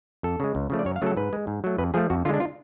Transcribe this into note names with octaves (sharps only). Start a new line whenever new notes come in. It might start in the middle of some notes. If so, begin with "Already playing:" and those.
F2 A4
C#3 G#3
C#2
C#3 F3 A3
D5
F#2 C#5
F5
C#3 F#3 A3 A4
G#2 B4
G#3
G#2
F#3 A3
F2 B4
F3 A3 G#4
F2 F#4
D3 G#3 D4 F4
F4